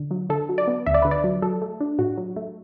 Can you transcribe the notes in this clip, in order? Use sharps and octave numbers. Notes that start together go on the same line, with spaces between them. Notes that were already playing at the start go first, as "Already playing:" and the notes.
Already playing: D3
F#3
D3 A4
F#3
D5
B3
D2 E5
D5
D3 B4
D5
F#3
F#3 A4
A3
D4
A2 F#4
F#3
A3